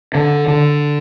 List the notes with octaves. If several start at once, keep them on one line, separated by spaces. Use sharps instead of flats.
D3
D3